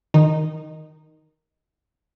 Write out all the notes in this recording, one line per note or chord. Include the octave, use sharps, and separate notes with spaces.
D#3 D#4